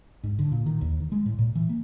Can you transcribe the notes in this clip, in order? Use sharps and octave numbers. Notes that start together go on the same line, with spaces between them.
G#2
D3
A#2
D#3
D#2
D#3
G#3
A2
A#2
E3
A#3